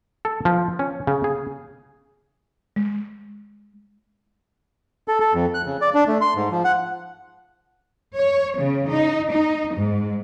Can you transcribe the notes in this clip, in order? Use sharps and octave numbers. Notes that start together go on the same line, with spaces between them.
A4
F3
C#4
C#3
G#4
G#3
A4
A4
F2
F#6
C#3
D5
D4
A3
C6
G#2
F3
F#5
C#5
C#3
D#4
D#4
G#2